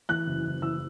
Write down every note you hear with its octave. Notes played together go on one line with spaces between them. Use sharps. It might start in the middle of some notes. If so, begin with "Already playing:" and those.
E3 F#6
F#1
F#1
E3 E6